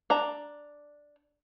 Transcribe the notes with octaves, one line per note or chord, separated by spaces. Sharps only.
D4 A#5